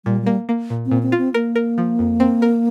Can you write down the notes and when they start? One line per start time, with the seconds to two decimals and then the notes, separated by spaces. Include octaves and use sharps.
0.05 A#2 G3
0.22 G3 A#3
0.49 A#3
0.70 A#2
0.86 C4
0.91 A#2
1.02 C4
1.12 F4
1.18 C4
1.34 A#3 A#4
1.55 A#4
1.78 F3
1.99 F2
2.20 C4
2.42 A#4